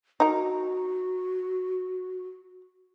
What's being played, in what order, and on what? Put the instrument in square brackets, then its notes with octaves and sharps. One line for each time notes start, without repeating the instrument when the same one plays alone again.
[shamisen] D#4 A#4 [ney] F#4